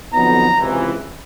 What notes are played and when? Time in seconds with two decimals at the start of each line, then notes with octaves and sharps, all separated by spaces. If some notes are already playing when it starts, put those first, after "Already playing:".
0.13 F2 D3 F#3 B3 D#4 A#5
0.57 C#2 C3 E3